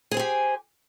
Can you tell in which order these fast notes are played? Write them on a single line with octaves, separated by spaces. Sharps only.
G#4 C5 G#5 G4